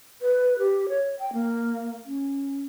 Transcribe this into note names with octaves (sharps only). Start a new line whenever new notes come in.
B4
G4
C#5
G5
A#3
C#4